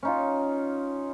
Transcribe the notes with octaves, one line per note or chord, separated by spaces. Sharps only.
C#4 D#4 F4